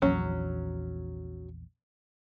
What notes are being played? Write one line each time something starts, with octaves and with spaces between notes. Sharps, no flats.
A#1 E2 F#3 C#4